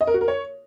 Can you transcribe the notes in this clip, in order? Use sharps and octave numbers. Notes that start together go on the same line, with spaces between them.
D#5
A#4
F#4
A#4
C#5